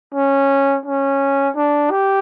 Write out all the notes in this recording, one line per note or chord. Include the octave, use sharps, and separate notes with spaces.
C#4
C#4
D4
G4